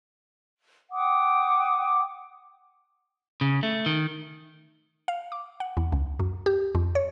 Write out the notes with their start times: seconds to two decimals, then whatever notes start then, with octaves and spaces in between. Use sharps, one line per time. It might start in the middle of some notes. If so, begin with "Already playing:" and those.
0.91 F#5 G5 D6 D#6
3.41 C#3
3.63 A3
3.86 D#3
5.08 F5
5.32 D6
5.60 F#5
5.77 E2
5.92 C#2
6.19 F#2
6.46 G4
6.75 F2
6.95 C#5